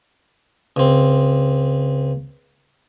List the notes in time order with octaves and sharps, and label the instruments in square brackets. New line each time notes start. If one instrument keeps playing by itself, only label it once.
[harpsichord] C#2 C4